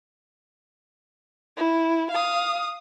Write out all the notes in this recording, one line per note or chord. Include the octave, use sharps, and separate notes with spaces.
E4
F5 D#6